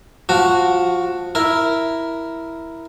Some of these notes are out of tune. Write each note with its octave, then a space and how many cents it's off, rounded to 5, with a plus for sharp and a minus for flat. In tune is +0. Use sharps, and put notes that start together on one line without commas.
F3 +20 F#4 +0
E4 +0 A#4 +0